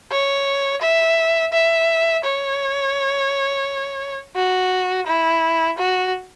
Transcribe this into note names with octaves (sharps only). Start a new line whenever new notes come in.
C#5
E5
E5
C#5
F#4
E4
F#4